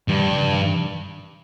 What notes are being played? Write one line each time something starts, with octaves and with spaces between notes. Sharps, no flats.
G2 D#3 G3
C#3 F3
F3
C3 D#3